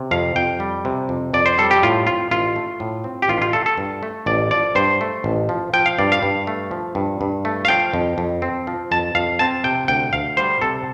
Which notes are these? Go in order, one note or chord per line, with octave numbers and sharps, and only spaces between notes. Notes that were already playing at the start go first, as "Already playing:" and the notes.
Already playing: C3
F2 F5
F2 G5
G3
C3
F2
F2 D5
C5
G3 A4
G4
A2 F4
C4 F4
A1 F4
A3
A2
C4
G4
A1 F4
F4
A3 A4
A4
G2
A3
A1 D5
F3 D5
G2 C5
A3
A1
F3
F3 G5
F5
G2 D5
F5
G2
A3
F3
G2
G2
A3
F5
F3 G5
F2
F2
C4
F3
F2 A5
F2 F5
C4 A5
C3 G5
D2 G5
D2 F5
G3 C5
C3 A4